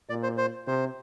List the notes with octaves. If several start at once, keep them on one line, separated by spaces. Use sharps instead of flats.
A#2 D5
C5
C5
C3 C5